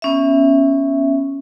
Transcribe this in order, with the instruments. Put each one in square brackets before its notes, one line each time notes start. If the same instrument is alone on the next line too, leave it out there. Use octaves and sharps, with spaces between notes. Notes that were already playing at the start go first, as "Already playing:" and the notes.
[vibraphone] B3 C#4 E5